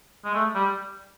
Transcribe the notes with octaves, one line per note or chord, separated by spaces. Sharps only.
G#3
A3
G3